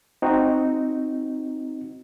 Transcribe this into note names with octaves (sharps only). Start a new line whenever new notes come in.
C4 D#4 F#4